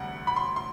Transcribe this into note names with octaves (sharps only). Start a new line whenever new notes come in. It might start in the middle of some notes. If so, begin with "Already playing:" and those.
Already playing: E1 D2 C3 G3 F#5
B5
C6
C6